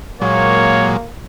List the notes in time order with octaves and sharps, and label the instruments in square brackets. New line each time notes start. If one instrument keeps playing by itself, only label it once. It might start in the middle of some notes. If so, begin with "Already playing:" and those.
[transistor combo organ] A#2 F#3 G#3 [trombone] A#3 [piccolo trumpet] C#5